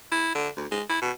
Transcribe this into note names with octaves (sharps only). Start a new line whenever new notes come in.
E4
D3
D2
G#3
E4
B2